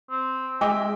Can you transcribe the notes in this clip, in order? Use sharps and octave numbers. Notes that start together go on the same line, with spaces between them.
C4
G#3 D#5 E5 G5 D6